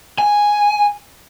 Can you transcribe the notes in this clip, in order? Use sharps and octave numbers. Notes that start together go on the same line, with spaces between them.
G#5